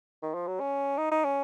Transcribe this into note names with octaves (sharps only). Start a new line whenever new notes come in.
D#3
F3
F#3
C#4
D#4
D#4
C#4